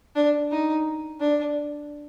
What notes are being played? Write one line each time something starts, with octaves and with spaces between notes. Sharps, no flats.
D4
D#4
D4